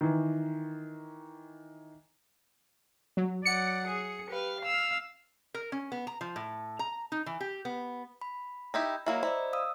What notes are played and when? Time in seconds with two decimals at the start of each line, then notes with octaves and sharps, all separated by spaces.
0.01 D#3 E3
3.17 F#3
3.45 F#3 D5 F#5 C#7
3.87 G#4
4.29 G4 B4 F5
4.61 F5 E6 F6
5.54 A#4
5.72 C#4
5.92 B3
6.07 A#5
6.21 F3
6.36 A2
6.79 A#5
7.12 D#4
7.26 E3
7.41 G4
7.65 B3
8.21 B5
8.74 D#4 E4 G4
9.06 F#3 A#3 E4 D#5 A#5
9.23 E4 C5 D5 D#5
9.53 F5 D#6 E6